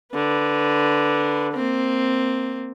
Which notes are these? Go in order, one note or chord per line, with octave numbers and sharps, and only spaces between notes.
D3 B4
A#3 C4